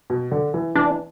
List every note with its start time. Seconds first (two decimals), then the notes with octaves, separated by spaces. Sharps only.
0.10 B2
0.32 D3
0.54 E3
0.75 E3 D4